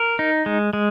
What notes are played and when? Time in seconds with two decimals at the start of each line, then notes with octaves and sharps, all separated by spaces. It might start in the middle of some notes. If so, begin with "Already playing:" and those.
Already playing: A#4
0.19 D#4
0.46 G#3
0.73 G#3